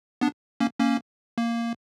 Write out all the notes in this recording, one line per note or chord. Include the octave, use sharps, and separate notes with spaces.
B3 D4
A#3 C#4
A#3 C#4
A#3